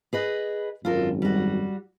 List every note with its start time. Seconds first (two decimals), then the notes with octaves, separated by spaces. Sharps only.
0.13 G#4 B4 D#5
0.85 G#1 F#2 F4 A4 A#4
1.22 G3 F#4